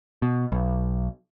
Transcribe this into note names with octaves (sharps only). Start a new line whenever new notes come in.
B2
B1